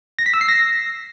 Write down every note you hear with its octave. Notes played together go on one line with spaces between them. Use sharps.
A#6
B6
E6
C7
A#6